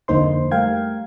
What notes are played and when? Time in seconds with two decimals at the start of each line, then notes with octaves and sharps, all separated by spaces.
0.08 F2 D3 A#3 D#4 C5 C6
0.51 G3 A3 A#4 F5 G5 G#6